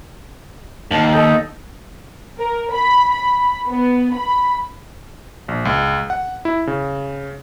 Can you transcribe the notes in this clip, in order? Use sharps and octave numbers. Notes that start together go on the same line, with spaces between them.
D#2 F5 F#5 A5
A4 D#5 G6
A#4
B5
B5
B3
B5
A#1
C#2
F#5
E4
C#3